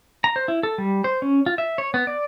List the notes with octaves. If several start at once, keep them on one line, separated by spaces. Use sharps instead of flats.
A#5
C5
E4
A4
G3
C5
C#4
F4
E5
C#5
B3
D5